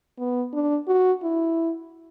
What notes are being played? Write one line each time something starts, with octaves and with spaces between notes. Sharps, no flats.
B3
D4
F#4
E4